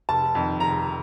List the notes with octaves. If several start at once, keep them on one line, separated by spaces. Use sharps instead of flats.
F1 A5
F2 D#3
F1 A#5